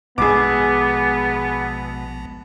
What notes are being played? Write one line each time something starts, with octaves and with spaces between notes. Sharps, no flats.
A#1 B2 G#3 B3 G#4 A4 D6